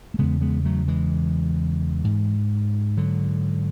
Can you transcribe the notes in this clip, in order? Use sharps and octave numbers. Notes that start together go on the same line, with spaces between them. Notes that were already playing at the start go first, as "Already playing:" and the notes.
A3
E2 C#3 G#3 B3
G#3 B3
F#3 A3
E3 G#3
G#2
D3 F#3